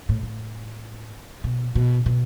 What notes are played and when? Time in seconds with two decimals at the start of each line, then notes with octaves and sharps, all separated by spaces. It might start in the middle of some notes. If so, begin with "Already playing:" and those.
0.09 A2
0.23 A2
1.44 B2
1.75 B2
2.06 B2